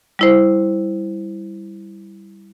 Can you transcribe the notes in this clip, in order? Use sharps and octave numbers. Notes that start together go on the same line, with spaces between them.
G3 E4 C5